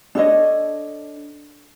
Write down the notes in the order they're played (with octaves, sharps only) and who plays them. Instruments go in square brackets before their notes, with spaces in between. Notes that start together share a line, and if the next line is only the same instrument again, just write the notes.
[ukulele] D4 A4 C#5 D#5